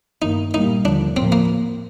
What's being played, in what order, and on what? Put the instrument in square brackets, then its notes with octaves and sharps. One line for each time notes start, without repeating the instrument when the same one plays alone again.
[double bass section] G2 D#3 A#3 [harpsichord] D#4
[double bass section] A#2 G3 A#3 [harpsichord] D#4
[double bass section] D#2 D3 F3 [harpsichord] D4
[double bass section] A2 F3 A#3 [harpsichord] C4
[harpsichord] A#3